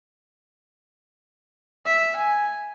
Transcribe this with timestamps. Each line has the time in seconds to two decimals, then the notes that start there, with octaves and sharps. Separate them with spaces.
1.86 E5
2.16 G#5